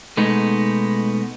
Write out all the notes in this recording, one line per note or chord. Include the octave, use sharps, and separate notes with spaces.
B2 G#3 A3 B3 D#4